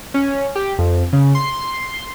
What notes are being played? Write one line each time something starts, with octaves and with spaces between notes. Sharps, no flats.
C#4
G4
F2
C#3
C6